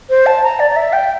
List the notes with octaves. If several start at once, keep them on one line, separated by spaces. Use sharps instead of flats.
C5
A5
A#5
D5
D5
E5
G5